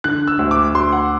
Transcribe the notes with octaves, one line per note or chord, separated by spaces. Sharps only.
D3 F#6
E6
D2
D6
D2 C6
F#5